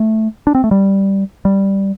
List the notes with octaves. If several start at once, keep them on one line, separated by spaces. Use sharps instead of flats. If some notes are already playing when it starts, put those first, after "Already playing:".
Already playing: A3
D4
C4
A3
G3
G3